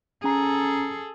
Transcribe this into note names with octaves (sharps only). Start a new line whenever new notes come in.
C#4 G#4 A4 A#5